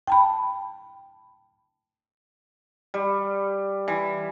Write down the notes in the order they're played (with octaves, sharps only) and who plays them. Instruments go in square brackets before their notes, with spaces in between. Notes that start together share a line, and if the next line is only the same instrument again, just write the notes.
[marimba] G5 A5 B5
[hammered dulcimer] G3
E3